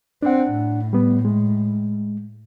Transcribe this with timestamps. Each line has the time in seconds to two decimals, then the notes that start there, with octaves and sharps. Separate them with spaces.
0.23 C4 D4 F#5
0.52 A2
0.93 G3 B3
1.25 G#3